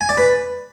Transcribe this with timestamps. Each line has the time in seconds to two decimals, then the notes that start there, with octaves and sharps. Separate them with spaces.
0.01 G#5
0.09 D5
0.17 B4